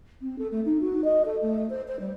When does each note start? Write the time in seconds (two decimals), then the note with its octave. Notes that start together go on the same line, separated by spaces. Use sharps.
0.21 C4
0.38 A4
0.51 A3
0.65 D#4
0.80 F#4
1.04 D#5
1.25 A4
1.41 A3
1.69 C5
1.87 C5
1.99 G3